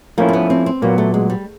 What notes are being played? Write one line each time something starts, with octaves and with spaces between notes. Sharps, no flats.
F3 A3 A#3 C#4 E4
C4
B3
C4
C4
A#2 F#3 A#3 B3
A3
G#3
G3